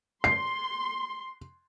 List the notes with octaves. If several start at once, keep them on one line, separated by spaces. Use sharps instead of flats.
C6 C7